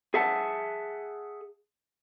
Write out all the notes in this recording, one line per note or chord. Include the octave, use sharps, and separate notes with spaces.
G#4 E5 F#5 A5